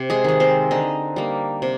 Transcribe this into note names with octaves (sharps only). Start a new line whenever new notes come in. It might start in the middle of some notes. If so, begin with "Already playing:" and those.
Already playing: C3
G#3 G#4
D#3 G#3
C4 C5
D3 D#4 D#5
G3 A#3
C3